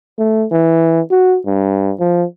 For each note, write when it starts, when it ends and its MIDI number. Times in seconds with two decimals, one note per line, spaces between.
0.18 0.46 57
0.51 1.00 52
1.11 1.38 66
1.46 1.93 43
1.99 2.24 53